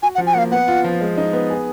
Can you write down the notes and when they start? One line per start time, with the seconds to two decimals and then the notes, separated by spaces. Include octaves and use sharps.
0.03 F#4 G#5
0.15 F#5
0.18 F3
0.27 G#5
0.34 A#3 F5 F#5
0.51 B3 F#5
0.68 F4
0.84 F3
1.01 G#3
1.18 D#4
1.33 B3
1.50 G#4